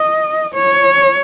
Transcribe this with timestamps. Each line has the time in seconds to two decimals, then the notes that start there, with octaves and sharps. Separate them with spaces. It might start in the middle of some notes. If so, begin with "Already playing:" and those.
Already playing: D#5
0.54 C#5